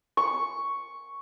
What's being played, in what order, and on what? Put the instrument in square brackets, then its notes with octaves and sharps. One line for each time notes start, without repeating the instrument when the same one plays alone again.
[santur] C#6